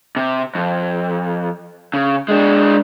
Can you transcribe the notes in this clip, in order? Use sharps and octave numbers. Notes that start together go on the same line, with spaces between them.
C3
F2
C#3
G#3 D4